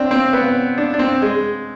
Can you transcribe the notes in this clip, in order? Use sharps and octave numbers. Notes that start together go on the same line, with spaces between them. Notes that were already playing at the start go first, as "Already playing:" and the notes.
Already playing: C4 D4
C4
B3
D4
D4
C4
G#3